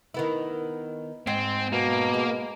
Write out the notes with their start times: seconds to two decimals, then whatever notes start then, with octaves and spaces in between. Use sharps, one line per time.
0.14 D#3 B3 E4
1.27 G#2 C4
1.72 B2 A#3
2.14 G#3